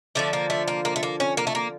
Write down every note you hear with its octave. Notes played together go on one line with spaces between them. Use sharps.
D3 F3 A3 D4
A#3
A3
A#3
A#3
A3
A#3
C#4
A#3
A3
A#3